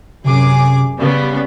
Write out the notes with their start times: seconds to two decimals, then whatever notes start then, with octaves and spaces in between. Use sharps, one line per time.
0.24 F#2 C3 G#4 D6
0.99 C#3 G3 B3 D5